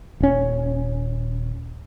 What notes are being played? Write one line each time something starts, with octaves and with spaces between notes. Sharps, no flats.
D#1 C#4